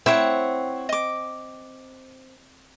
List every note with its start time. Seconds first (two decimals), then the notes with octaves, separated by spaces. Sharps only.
0.06 C4 E4 C#5 F#5
0.89 D#5 D6